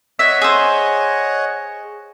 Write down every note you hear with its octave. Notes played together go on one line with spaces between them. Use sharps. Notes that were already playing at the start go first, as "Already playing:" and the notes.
C#5 D#5 E5 F#5
G#4 C5